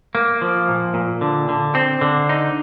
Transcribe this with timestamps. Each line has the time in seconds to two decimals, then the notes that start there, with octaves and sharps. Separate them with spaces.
0.15 A#3
0.42 F3
0.68 A#2
0.94 A#2
1.21 D3
1.49 D3
1.75 C4
2.01 D3
2.29 D#4